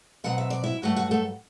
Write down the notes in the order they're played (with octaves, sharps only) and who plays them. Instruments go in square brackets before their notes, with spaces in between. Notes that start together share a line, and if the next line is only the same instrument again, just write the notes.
[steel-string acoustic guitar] B2 F#3 C4 F#5
E5
D5
E4 E5
G2 F#3 A3 F#4 F#5
F#4 F#5
A3 A4